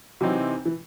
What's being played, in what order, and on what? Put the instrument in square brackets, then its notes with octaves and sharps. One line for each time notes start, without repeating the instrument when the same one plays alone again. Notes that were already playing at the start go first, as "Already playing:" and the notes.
[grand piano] C3 E3 C4 D#4 [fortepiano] F#3
[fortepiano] E3